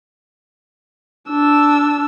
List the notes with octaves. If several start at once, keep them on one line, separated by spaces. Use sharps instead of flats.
D4 E6